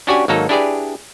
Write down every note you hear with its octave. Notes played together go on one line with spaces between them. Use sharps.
C#4 D4 F#4 G4 D5 G#5
G#1 F#3 A#3 D#4 A4
D4 E4 G4 G#4 B4 D5